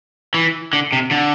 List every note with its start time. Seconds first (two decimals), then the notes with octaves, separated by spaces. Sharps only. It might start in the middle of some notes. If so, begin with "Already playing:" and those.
0.34 E3
0.73 D3
0.93 C3
1.11 D3